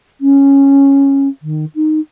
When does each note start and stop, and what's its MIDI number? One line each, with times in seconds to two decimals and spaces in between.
0.21 1.28 61
1.42 1.65 51
1.75 2.00 63